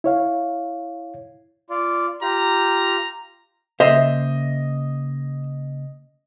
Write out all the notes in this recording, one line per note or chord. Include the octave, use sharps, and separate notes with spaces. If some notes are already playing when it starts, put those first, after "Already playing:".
E4 C#5 F5
F4 D5
F4 G4 A#5
C#3 A#3 C5 D#5 E5